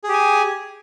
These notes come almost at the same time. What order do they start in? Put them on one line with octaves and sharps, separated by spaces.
G#4 G4 G#5